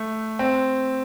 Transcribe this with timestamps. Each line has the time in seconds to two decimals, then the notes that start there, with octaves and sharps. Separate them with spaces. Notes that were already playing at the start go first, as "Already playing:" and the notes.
Already playing: A3
0.39 C4